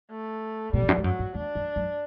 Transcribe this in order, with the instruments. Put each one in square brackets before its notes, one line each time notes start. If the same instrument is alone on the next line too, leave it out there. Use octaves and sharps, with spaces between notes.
[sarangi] A3
[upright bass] B2 [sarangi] G3
[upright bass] E2
F#2
G2
[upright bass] F#2 [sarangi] F#3
[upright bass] G2
[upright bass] E2 [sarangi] D4
[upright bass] F#2
F#2